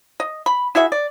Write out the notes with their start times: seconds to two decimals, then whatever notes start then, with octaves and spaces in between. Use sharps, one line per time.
0.20 D#5
0.46 B5
0.75 E4 F#4 G#4 E5
0.92 D5